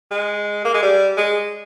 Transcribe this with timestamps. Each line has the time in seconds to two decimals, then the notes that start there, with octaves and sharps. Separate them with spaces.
0.11 G#3
0.65 A#3
0.74 G#3
0.82 G3
1.17 G#3